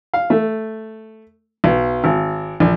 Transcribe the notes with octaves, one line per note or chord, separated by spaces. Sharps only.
F5
A3
B1
G#1
A#1